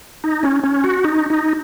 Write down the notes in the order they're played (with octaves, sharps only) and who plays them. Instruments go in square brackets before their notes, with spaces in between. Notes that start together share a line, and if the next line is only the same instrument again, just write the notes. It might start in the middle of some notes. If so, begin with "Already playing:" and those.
[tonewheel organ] D#4
C#4
C#4
F#4
D#4
D#4